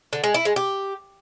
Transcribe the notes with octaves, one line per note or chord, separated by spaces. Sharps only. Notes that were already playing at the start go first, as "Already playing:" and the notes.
D3
G#3
E4
G#3
G4